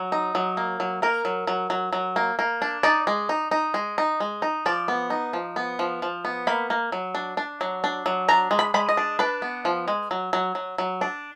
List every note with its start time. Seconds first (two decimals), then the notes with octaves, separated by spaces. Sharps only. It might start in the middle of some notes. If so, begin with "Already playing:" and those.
Already playing: F#3
0.12 D#4
0.35 F#3
0.57 A#3
0.80 F#3
1.02 A#3 A#4
1.25 F#3
1.47 F#3
1.70 F#3
1.93 F#3
2.16 A#3
2.39 A#3
2.62 D4
2.83 D#4 D5
3.07 G#3
3.29 D#4
3.51 D#4
3.74 G#3
3.98 D#4
4.20 G#3
4.42 D#4
4.66 F3 D5
4.88 B3
5.10 D#4
5.33 F3
5.56 B3
5.79 F3
6.02 F3
6.25 B3
6.47 A#3 B5
6.70 A#3
6.92 F#3
7.15 D4
7.37 D4
7.61 F#3
7.84 D4
8.06 F#3
8.28 D4 A#5
8.51 G#3
8.59 B5
8.74 G#3 B5
8.89 D#5
8.97 D4
9.19 D4 B4
9.42 B3
9.65 F3
9.88 G#3
10.11 F#3
10.33 F#3
10.55 F#3
10.78 F#3
11.01 D4